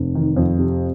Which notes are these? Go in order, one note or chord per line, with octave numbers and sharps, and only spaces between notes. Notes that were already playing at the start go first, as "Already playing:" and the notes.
Already playing: F1
D#3
F2
C3